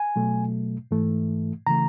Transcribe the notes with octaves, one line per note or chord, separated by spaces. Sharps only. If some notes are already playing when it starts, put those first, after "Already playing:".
Already playing: G#5
B2 F#3 A3
G#2 E3 A3
C#3 E3 A3 A#5